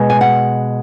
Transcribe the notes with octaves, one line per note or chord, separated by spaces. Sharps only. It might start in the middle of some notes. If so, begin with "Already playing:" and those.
Already playing: B2 G#3 B3
G#5
F#5